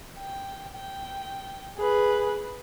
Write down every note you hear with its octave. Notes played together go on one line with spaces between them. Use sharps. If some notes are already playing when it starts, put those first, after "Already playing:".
G5
G5
G#4 B4